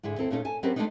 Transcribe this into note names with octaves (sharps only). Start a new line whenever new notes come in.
G#2 D3 E4 G#4
D#2 C4 A4
A#2 A3 C#4 D#4 A4
A4 G#5 A5
F#3 C4 C#4 G4 A#4 B4
G#3 A3 B3 C4 D4 D#4